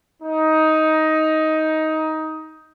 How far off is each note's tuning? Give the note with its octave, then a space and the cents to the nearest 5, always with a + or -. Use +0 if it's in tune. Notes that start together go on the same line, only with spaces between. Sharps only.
D#4 +15